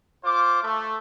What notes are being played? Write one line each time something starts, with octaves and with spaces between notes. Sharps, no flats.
F4 C5 D6
A3